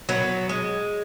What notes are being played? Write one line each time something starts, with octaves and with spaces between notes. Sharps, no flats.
F#3 B3
G#3